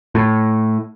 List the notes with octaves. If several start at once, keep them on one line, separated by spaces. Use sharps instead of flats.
A2